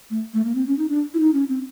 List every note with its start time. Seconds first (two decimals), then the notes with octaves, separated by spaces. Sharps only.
0.10 A3
0.34 A3
0.45 A#3
0.55 C4
0.67 C#4
0.78 D#4
0.90 D4
1.14 E4
1.20 D#4
1.34 C#4
1.49 C4